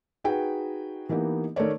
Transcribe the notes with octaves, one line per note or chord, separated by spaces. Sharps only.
D#4 F#4 G#4 B4 G5
E3 A#3 B3 D#4 G4
D#3 A3 A#4 C#5 D5